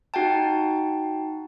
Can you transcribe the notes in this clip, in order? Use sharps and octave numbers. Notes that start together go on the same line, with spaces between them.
D#4 F#4 F#5 G5 A5